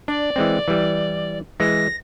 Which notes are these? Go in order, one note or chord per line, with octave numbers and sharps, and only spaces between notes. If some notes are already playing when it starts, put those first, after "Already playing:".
D4 D5
E3 G#3 C4
E3 G3
E3 G#3 A#6